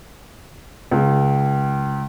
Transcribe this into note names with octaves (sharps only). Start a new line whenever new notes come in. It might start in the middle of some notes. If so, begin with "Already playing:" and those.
C#2